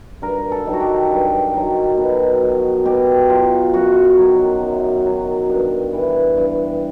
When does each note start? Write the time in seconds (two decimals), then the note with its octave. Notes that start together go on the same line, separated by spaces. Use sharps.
0.22 G2 A#4
0.52 A4
0.66 D#3 F#3
0.73 F#4
0.80 G4
1.10 G2
1.54 D#3 F#3
1.97 B2
2.42 F#3
2.85 B2 G4
3.29 F#3 F4
3.74 F#2 F#4
4.17 D#3 F#3
4.62 F#2
5.06 D#3 F#3
5.49 G2
5.93 E3
6.37 G2